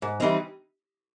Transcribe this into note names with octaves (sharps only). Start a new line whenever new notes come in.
G#2
E3 G3 C4 D#4